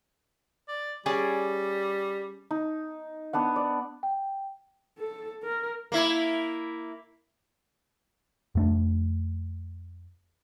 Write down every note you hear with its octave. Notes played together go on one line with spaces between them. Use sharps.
D5
G3 C#4 G#4 D5
D#4
B3 D4 F#5
D5
G5
A4
A#4
A#3 E4
F2 A3 D4